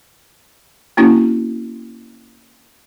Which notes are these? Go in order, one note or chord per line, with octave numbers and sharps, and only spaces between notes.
A#3 C4 C#4 E4 F#4